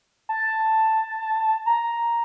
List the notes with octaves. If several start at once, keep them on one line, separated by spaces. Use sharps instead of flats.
A5
A#5